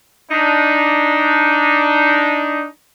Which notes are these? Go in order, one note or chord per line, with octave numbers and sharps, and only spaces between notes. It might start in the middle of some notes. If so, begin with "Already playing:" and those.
D4 D#4